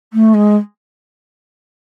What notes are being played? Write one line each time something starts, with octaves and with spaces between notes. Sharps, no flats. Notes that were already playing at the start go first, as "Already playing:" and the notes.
A3
G#3